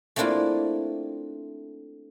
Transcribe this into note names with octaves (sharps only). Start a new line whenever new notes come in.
A3 A#3 C4 D4 E4 F4